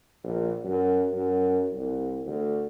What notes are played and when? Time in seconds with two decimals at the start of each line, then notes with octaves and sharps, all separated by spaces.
0.23 A#1
0.64 F#2
1.11 F#2
1.72 C2
2.26 D2